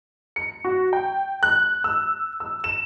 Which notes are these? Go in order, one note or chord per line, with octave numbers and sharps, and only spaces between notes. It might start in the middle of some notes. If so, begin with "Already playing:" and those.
C#7
F#4
G5
F#6
E6
E6
E7